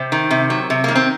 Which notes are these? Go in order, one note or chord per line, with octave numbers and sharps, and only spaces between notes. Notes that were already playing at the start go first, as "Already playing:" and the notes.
Already playing: C3 C4
D#3
C3
F#3
C3
D#3 A#3
C4